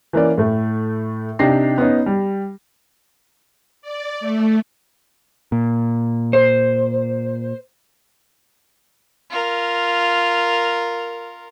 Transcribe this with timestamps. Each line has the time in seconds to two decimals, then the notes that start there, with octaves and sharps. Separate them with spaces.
0.13 E3 A#3 C#4 D5
0.38 A2 A3
1.39 C3 D4 D#4 G4 A#6 C7
1.78 B3 C#4 D#4
2.06 G3
3.82 D5
4.20 A3
5.52 A#2
6.33 C5
9.30 F4 A#4